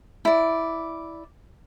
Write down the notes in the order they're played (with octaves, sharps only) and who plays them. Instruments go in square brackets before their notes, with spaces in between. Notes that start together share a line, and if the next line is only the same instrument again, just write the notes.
[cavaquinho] E4 D5